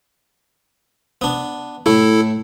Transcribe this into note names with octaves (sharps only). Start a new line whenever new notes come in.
B3 D4
A2 A3 E4 A4